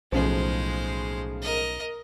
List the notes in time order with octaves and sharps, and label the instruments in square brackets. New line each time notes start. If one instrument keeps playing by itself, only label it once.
[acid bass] B1 [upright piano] A2 C#3 F3 [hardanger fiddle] G#3 C5
[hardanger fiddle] A#4 D#5